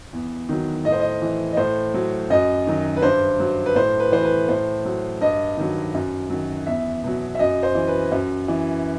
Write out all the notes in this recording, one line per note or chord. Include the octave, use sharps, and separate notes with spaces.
E2
D#3 F#3
A2 D#5
C5
D#5
E3
D#5
A2 C5
F#3
F#2 D#5
D#3 F#3
B4
G2 C5
F#3
B4
A2 C5
B4
E3 C5
B4
A2 C5
F#3
G2 D#5
D#3 F#3
F#2
D#3 F#3
E2 E5
B2 F#3
E5
F#2 D#5
C5
E3
B4
F#2
E3